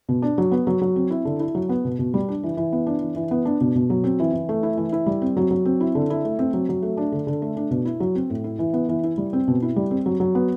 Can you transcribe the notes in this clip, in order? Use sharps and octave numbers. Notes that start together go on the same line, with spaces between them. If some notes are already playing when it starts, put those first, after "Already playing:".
B2
D4
F#3
B3
F#3
F#3
C4
E4
D3
E4
F#3
B3
B2
B2
G3
D4
E3
E3
B3
D4
E3
E3
B3
D4
B2
B2
F#3
C4
E3
E3
A3
E4
E3
E4
G3
C4
F#3
F#3
C4
E4
D3
E4
A3
C4
F#3
F#3
A3
D4
D3
D3
A3
D4
B2
E4
F#3
C4
A2
E4
E3
B3
E3
E4
G3
C4
B2
E4
G3
C4
F#3
F#3
B3